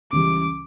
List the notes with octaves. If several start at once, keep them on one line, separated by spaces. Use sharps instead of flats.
C#2 C#3 E3 G3 D6